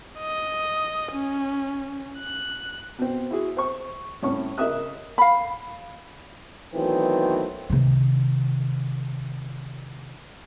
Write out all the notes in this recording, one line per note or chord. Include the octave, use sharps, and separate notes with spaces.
D#5
C#4
F#6
B2 C4
E4 F#4 G#4
C5 C#6
C2 A2 C#4 C#6
C#3 A#4 D#5 E5 D#6 F#6
F5 B5
D#3 E3 F#3 A3 B3 C4
C3 D#3